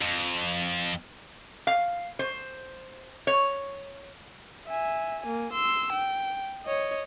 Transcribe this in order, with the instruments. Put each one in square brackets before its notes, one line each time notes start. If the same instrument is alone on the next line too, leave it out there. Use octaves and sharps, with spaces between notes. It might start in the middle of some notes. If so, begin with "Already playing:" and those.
[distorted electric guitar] F2
[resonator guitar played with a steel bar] F5
C5
C#5
[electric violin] E5 G#5
A#3 G#5
C6 E6
G5
C#5 D#5